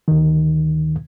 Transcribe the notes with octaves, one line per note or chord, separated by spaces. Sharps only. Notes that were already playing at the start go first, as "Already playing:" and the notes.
D2 D#3